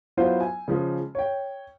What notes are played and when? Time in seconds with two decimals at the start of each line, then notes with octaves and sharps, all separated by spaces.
0.17 F#3 B3 E4 F4 C5
0.41 G#5
0.68 C#3 F3 G#3
1.15 C#5 G5